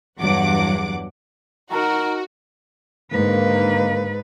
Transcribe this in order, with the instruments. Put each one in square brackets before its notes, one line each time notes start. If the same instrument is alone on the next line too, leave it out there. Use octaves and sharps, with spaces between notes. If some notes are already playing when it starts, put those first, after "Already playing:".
[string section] E2 G2 F#3 F#5 D6
[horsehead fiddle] D#4 A#4 [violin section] F#4 [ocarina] A#5
[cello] G#2 B4 [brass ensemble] D3 D#3 A#3